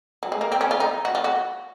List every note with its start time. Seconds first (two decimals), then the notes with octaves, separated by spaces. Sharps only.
0.23 F#3
0.32 G#3
0.41 A#3
0.52 C4
0.61 C#4
0.71 F4
0.80 D#4
1.05 F#4
1.15 F4
1.24 F#4